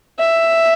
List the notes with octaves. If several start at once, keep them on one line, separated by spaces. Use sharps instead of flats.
E5